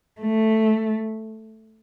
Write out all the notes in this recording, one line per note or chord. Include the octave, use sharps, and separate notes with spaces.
A3